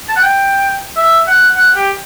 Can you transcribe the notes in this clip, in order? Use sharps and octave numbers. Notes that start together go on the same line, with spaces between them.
A5
F#5
G5
E5
F#5
F#5
G4